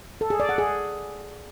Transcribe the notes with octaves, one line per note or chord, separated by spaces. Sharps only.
A4
G#4
D5
F#5
G#4